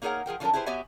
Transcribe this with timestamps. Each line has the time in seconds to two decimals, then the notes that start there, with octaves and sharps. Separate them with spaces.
0.02 A#3 D#4 G#4 A#4 C#5 F#5
0.26 F3 G#4 A#4 G5
0.40 D3 F3 F#3 C#4 A4 A#4
0.53 E4 G4 G#4 B4 C5
0.66 B3 F#4 G4 C#5 E5 G#5